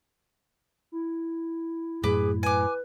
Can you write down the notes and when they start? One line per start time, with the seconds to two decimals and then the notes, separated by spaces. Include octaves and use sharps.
0.92 E4
2.04 F#2 A2 G#4 B4 D6
2.43 B4 G#5 D6